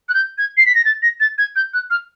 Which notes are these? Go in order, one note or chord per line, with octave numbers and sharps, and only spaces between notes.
F#6
G6
G#6
C7
B6
A#6
A6
A#6
A6
G#6
G6
F#6
F6